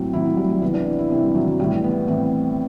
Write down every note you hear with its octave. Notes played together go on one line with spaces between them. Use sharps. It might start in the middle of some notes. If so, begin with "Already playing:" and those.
Already playing: A2 F#3 C4
A2 F#3 E4
F#3
G3
G3
C3 E3 B3
D4
E4
E4
C3 E3
G3
F#3
F#3
A2 E3 G3
B3
A2 E3 C4